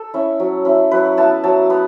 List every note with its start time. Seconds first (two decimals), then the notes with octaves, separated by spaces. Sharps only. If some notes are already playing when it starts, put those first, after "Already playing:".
Already playing: A4
0.14 C#4 E4
0.40 F#3
0.65 C#4 E4
0.91 F#3 B4
1.17 B3 E4 A5
1.44 F#3 A5
1.70 B3